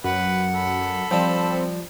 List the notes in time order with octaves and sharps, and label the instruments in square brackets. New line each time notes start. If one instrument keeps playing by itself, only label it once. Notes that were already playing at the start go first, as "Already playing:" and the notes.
[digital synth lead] F#2 [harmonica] B4 [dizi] F#5
[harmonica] A4 B5
[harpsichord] F3 G3 [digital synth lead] C4 [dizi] A5